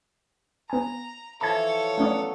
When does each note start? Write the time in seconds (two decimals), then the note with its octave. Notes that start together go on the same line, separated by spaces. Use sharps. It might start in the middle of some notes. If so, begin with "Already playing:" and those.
0.70 B3 G#5 A#5
1.41 E3 F3 A4 C#5 A5 G#6
1.98 F#3 A3 B3 C#4 D5